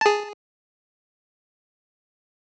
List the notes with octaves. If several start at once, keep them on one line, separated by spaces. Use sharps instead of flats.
G#4 A5